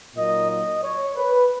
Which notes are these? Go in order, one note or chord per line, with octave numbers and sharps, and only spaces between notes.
A#2 F#3 A#3 D#4 D#5
D#5
C#5
B4